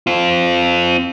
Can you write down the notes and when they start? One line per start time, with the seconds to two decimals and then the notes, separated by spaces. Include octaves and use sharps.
0.07 C4 F4